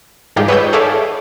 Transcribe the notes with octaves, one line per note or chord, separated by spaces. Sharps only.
G#2 D#3 G3 F4 G4 G#4
B4 C#5 D#5 F#5 E6 G6
G#4 A4 C#5 D5 E5 F5